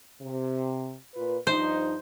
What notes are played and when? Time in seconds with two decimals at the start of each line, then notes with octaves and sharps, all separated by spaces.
0.22 C3
1.15 A#2 F4 B4
1.47 G2 F3 D#4 C5